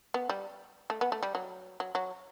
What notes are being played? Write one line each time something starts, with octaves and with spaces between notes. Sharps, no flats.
B3
G3
A3
B3
A3
G3
F#3
F#3
F#3